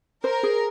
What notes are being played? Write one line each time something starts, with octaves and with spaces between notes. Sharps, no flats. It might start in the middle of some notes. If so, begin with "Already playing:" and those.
A#4 C5
G#4